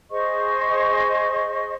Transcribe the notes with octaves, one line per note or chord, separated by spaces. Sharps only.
G#4 C5 D#5 C#6